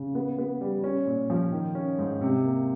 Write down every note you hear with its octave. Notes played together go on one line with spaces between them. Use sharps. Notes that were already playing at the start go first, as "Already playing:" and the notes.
Already playing: C#3
B3
B3
G3
C#4
A#2
F3
D#3
C#4
G#2
C3
A#3